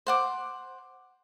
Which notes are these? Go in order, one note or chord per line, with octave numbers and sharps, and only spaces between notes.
C5 F#5 D6